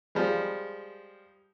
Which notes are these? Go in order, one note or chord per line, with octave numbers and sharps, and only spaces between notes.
F3 G3 G#3